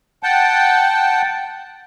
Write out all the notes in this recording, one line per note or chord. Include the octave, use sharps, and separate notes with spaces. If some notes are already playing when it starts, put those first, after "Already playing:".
F#5 G5 A5